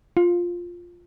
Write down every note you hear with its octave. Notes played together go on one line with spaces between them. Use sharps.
F4